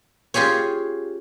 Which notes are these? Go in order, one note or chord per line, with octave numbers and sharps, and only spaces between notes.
C#4 F4 G4 G#4 C#5